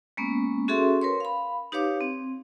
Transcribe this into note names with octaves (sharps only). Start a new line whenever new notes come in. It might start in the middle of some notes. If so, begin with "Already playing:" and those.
G#3 A#3 B3 C#4
C#4 F#4 G#4 A4 E5 C6
A#4 B4 C#5 C6
F5 B5
D#4 G4 B4 C#5 F5 D6
C4